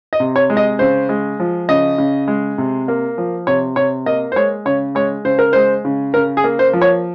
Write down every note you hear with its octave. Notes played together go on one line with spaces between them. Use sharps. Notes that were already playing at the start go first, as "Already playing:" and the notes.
D#5
C3
C#5
G#3
D#5
C#3 C5
G#3
F3
C#3 D#5
C#3
G#3
C3
A#3
F3
C3 C#5
C3 C#5
A#3 D#5
C5
G#3 C#5
C#3 C#5
G#3 C#5
C#3 C5
A#4
G#3 C5
C#3
C#3 A#4
G#4
A#3
C5
F3
C#5